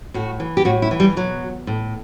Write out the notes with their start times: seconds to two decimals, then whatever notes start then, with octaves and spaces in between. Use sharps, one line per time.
0.14 A2 F#4
0.40 E3
0.57 G4
0.65 A2 F#4
0.82 E4
0.91 E3
1.00 G3
1.16 B2 F#3
1.67 A2